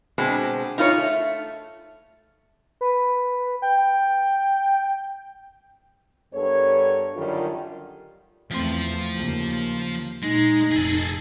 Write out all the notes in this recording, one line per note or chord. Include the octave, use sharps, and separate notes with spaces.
B2 G#3 C4 D4
D#4 F4 B4 C#5
A3
B4
G5
G2 B3 A4 A#4 C#5
F#2 D3 D#3 G3 D4 F4
E2 F3 A3 C4 C6
D#2 C#3 A#3
A#2 G#3 D#4
F1 G#4 A4